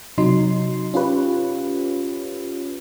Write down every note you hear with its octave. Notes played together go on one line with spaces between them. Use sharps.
C3 F#3 D#4 C6
C#4 F4 G4 B4 C#5